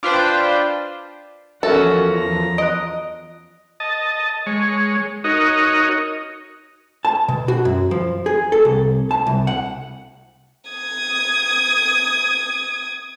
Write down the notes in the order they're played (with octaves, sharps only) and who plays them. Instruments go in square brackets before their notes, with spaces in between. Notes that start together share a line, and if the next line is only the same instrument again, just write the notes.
[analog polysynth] D4 F4 B4 C5 G5
[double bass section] E2 F3 [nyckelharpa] C#4 F#4 [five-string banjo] A4 [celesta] A#4 E5
[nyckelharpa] A#5
[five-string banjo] D#5 [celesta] F#6 D7
[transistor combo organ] D#5 A5
G#3 C#5
D#4 F#4 A#4 C#5 D#5
[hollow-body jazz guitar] A5
B2
F#4
F#2
F3
G#4
A4
C2
A5
C2
F#5
[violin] D#6 G#6